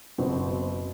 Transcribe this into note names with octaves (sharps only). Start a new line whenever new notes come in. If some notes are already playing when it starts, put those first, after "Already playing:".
F#1 B2 C4